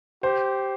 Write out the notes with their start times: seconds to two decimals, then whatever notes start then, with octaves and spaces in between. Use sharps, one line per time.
0.23 G4 C5